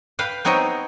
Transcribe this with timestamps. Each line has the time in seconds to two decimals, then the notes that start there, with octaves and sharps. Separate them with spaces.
0.19 B4 F5 G5
0.45 B3 C4 D#4 C#5 D#5 G5